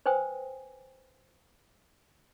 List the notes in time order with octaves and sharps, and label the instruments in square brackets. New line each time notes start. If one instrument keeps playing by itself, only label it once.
[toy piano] B4 C5 G5 G#5 D#6